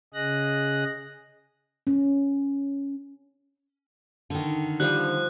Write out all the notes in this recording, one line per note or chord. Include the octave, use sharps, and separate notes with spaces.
C#3 G#4 D#5 F#6 A#6
C#4
D3 D#3
F3 G3 C5 F#6